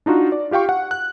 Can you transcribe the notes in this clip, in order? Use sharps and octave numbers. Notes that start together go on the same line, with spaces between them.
D4 D#4 F4 F#4
D5
F4 G4 F5 G5 C#6
F#5
F#6